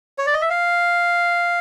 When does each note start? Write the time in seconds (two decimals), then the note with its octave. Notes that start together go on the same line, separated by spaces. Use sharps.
0.18 C#5
0.26 D5
0.34 D#5
0.41 E5
0.50 F5